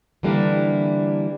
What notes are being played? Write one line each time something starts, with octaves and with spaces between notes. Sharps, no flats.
D3 E3 G3 A#3 D4 E4